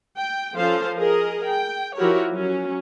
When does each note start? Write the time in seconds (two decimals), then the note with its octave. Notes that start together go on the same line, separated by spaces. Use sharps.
0.18 G5
0.57 F3 C#4 F4 A4 C5 F5
0.98 G#4 A#4 D#5
1.45 G5
1.96 F3 E4 F#4 G4 A#4 C#5
2.30 F#3 C#4